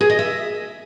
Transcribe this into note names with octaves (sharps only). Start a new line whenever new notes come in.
G#4
D#5
E5